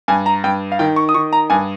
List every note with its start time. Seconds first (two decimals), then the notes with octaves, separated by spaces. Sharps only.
0.08 G2 G#5
0.26 A#5
0.44 G2 G5
0.72 F5
0.79 D#3 G5
0.96 C#6
1.09 D#6
1.14 D#3 C#6
1.33 A#5
1.50 G2 G#5